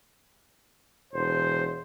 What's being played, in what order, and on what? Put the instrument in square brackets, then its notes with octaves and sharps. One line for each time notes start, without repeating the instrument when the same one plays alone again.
[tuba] E1 [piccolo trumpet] C5